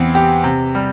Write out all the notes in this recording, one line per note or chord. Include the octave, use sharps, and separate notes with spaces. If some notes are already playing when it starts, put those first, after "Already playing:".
Already playing: E2 E3 C4
G4
C3
G3